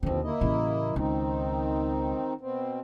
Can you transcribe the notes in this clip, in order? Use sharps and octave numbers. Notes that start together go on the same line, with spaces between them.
D#2 B2 D3 F3 C4
A#3 E4 D#5
A1 C#3
C#2 D#3 C4 D#4
B2 C4